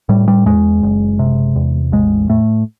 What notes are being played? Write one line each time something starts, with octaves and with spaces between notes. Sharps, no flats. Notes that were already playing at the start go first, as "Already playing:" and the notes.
A2 G3
G3
E2 G#3
F#1
C3
E2
A1 G#3
A2 A3